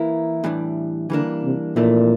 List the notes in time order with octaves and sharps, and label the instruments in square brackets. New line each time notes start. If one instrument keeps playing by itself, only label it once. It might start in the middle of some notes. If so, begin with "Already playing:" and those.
Already playing: [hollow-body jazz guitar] E3 A#3 E4 A#4
A2 E3 G3 D4
[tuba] D3 [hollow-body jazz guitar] E3 G3 A#3 D4
[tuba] C3
[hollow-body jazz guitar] F2 E3 A3 D4 [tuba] A#2